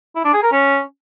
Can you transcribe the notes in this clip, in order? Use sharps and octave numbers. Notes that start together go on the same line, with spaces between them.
E4
D4
G#4
A#4
C#4